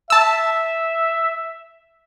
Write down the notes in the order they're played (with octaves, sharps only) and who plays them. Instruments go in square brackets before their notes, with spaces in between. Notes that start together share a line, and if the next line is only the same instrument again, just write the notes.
[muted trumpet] E5 [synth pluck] A5 E6